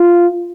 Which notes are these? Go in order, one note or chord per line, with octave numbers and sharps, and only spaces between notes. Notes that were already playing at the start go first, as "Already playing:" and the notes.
Already playing: F4